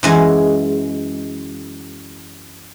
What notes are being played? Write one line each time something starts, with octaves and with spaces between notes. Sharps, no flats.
F#2 E3 G#3